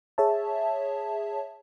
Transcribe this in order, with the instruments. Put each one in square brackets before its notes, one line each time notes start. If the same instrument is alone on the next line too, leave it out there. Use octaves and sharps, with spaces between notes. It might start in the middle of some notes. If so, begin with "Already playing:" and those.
[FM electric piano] G#4 C#5 E5 A5